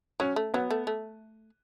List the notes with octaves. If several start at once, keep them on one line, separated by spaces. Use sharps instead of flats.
F#3 C#4
A3
F#3 B3
A3
A3